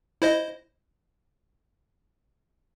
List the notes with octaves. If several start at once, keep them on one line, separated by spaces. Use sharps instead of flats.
E4 C5 D#5